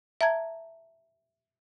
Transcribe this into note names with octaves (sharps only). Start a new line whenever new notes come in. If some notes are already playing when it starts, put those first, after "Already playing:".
E5 A5 A#5 G#6